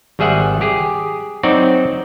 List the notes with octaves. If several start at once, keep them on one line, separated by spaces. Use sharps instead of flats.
G#1 G3 G#4 E5 F#5
G4 G#4
F#3 C4 D#4 F#4 D5